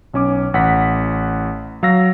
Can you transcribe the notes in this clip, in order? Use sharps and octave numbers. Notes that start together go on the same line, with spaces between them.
B1 C#4 D6
A1 F#5 B6
F#3 F5 E6 A#6